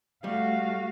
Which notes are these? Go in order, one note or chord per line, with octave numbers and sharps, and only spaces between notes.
G3 A3 F#4 F5